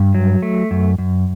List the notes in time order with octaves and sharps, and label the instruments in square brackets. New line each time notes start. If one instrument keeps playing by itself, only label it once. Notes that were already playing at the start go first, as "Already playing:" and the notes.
Already playing: [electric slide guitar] G2
F#3
A3
F#2
F#2